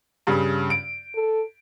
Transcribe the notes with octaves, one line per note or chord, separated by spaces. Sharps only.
G2 C#3
D7
A4